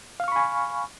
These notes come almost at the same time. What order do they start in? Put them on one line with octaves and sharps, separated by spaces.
F5 F6 C#6 B5 G#5